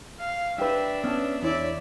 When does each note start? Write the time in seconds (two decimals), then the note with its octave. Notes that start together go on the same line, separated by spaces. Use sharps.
0.19 F5
0.58 D4 G4 B4 E5
1.04 B3 C#4 A5
1.42 E2 D4 E4 C#5 D5 E5